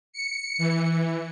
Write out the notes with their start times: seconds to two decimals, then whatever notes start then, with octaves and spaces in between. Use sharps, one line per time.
0.13 C#7
0.58 E3